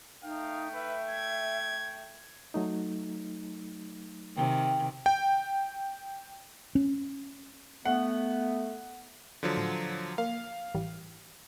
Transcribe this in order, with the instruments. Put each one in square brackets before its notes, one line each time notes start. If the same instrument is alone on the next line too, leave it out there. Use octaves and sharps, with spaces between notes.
[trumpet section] A3 G5 [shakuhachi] D#4 [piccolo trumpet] F5
[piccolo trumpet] B4 [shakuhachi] E5
[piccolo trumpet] G#6
[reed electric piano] F#3 A3 D#4
[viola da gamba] C3 D#3 [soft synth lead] G5
[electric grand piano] G5
[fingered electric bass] C#4
[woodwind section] A3 B3 [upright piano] F#5
[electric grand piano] D3 F3 F#3
[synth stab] A2
[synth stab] A#3 [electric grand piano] F5
[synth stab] A1 E3 G3